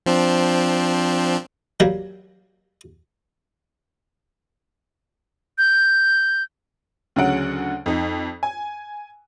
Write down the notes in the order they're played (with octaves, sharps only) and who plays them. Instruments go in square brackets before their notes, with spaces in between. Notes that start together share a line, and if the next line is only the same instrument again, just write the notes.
[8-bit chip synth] F3 C4 D4
[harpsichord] F#3 G3 A#3
[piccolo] G6
[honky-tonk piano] D2 C#3 F#3 F#5 D7
F2 D#4
G#5